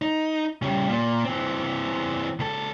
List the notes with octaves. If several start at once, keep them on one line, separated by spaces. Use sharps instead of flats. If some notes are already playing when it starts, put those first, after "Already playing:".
D#4
C#3 G3
A#2
E3 C4
C#2 A4